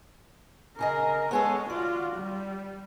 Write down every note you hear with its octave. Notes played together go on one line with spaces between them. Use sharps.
C#3 G#4 A#4 D#5
G#3 B3 G#4 A4 C#5
F4 F#4 D5
G3